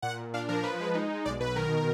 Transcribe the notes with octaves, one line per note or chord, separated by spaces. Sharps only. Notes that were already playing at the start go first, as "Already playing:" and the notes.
A#2 F#5
A#2
D4 F5
F3 A#4
F3 B4
G#3
D#4
G#3
B1 D5
B2 B4
D#3 A#4